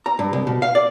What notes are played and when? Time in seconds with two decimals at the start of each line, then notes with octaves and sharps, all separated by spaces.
0.06 A#5
0.19 G2
0.33 C2
0.47 B2
0.62 F5
0.75 D5